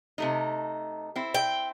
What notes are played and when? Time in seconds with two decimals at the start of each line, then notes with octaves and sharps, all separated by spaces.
0.18 C3 A3 D#4
1.16 C4 E4
1.34 G5